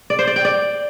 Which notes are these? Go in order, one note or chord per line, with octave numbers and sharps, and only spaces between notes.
D5
C5
D5
G5
D5